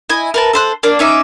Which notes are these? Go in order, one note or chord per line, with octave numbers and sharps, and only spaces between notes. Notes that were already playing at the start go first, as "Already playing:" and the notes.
E4 D#5 G#5
A#4 B4 A5
A4 C5 F#6
A#3 D4 D5
C#4 D#4 E5 D6